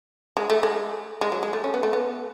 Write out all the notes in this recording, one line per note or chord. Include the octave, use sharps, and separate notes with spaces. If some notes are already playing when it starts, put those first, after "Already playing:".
G#3
A3
G#3
G#3
F#3
G#3
A3
C#4
B3
A3
B3